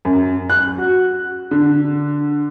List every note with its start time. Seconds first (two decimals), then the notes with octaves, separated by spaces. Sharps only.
0.05 F#2
0.50 F#6
0.78 F#4
1.51 D3